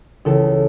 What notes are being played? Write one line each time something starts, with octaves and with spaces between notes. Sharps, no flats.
C#2 C#3 E3 A4